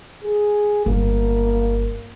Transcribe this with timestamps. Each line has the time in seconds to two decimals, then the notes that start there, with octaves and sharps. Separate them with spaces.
0.24 G#4
0.86 G1 A#3